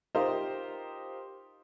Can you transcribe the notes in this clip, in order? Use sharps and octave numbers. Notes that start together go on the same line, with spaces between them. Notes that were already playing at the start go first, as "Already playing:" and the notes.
D#4 F4 G4 A#4 C5